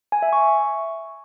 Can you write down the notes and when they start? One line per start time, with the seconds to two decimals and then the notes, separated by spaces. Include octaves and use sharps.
0.12 G#5
0.22 E5
0.33 C#6